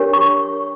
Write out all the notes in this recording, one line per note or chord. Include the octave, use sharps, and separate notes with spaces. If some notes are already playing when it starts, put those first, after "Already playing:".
Already playing: D4 G4 A#4 C#5
C#6